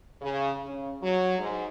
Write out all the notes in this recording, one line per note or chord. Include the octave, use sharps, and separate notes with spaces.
C#3
C#3
F#3
G#2